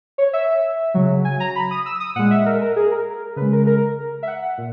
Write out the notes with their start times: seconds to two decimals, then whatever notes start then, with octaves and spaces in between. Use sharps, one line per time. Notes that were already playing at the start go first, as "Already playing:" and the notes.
0.18 C#5
0.33 E5
0.94 C#3 F#3
1.25 G#5
1.40 A#5
1.56 B5
1.71 D#6
1.86 E6
2.00 D#6
2.16 A#2 G#3 F#5
2.31 E5
2.46 A#4
2.61 A#4
2.76 G#4
2.91 A#4
3.36 C#3 G#3 B4
3.53 A#4
3.67 A#4
4.23 E5
4.27 F#5
4.58 A#2